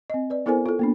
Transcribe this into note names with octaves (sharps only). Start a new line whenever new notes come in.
C4 D#5
B4 D5
B3 E4 A4 A#4 C5 G#5
F4 A4
A#3 B3 D4